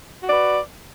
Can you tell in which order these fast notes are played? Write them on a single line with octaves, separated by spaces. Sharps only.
F#4 D5 B4